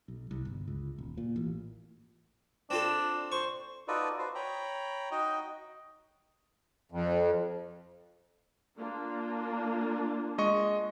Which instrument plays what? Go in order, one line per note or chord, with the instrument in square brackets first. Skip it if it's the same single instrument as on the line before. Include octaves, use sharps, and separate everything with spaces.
[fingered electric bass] B1
C2
G1
C#2
D#1
A#2
A1
[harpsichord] C4 F4 A4 [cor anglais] D4
[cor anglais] C5 [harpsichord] C#6
[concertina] D#4 F4 F#4 A4 B4 D5
F#4 B4 C5
C#5 G5 A#5 B5
D#4 F#4 D#5 G5
[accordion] F2
[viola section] A#3 D4 F4
[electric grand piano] G#3 D#5 C#6